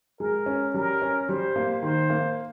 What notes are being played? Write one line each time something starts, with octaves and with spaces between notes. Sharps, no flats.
G#3 A#4
C#4
G3 A#4
C#4
G3 C5
A#3
D#3 C5
A#3